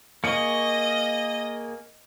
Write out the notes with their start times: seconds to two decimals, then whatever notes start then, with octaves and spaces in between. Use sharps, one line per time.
0.24 A#3 G#4 D#5 C#6 C#7